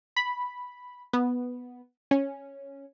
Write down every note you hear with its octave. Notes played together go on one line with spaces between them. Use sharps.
B5
B3
C#4